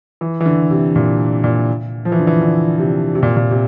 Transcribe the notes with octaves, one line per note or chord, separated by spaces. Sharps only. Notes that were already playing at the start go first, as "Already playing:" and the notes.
E3
E3
D3
C3
A#2
A#2
F3
E3
D3
E3
D3
C3
C3
A#2
A#2
C3